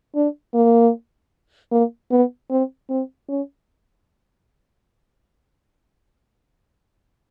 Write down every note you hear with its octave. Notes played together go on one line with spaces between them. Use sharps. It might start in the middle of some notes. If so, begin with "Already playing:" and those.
D4
A#3
A#3
B3
C4
C4
C#4